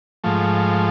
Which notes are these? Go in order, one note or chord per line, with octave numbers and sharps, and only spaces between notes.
G#2 F3 A3